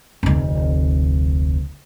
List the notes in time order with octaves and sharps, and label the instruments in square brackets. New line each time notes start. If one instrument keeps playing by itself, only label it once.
[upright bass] F1 D2